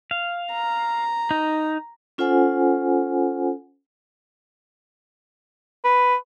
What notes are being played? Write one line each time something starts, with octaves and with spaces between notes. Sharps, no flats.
F5
A#5
D#4
C#4 F4 A4 C5 F#5 G#5
B4